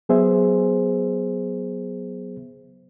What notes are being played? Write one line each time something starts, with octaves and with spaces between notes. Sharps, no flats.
F#3 B3 G#4 C5 E5